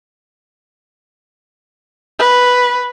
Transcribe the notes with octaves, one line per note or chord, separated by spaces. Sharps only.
B4